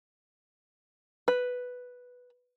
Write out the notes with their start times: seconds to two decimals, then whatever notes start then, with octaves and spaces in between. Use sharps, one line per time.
1.28 B4